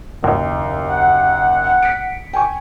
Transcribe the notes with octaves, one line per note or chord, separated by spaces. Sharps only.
F#1 D#2
F#5
B6 C#7 D7
G5 G#5 C#6